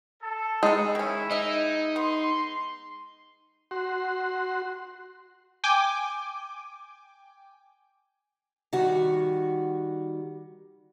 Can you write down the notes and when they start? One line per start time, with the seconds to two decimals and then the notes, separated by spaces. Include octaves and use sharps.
0.22 A4
0.63 E3 G#3 D#4
0.95 D#3 C#4 E4
1.31 D#4 D#5 E5
1.96 B3 C6
3.71 F#4 C6
5.64 G5 G#5 D6
8.73 D#3 G3 F#4